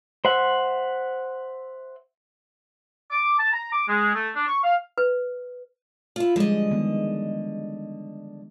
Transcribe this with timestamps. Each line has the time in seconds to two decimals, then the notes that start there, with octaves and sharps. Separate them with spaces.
0.25 C5 E5 F#5
3.11 D6
3.39 A5
3.53 A#5
3.72 D6
3.88 G#3
4.14 A3
4.36 D4
4.48 C#6
4.64 F5
4.98 B4
6.16 E4 F4
6.36 D3 F3 G3 G#3 D#5
6.71 D#3 B3